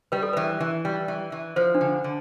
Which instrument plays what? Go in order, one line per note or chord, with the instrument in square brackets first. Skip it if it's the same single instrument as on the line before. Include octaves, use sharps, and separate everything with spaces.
[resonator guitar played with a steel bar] G3 [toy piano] B4
[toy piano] A4
[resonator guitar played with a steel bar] E3 [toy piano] B4
[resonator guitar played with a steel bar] E3
G3
E3
E3
[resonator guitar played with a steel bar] F3 [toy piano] C5
[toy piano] D4
[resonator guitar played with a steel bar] D3
D3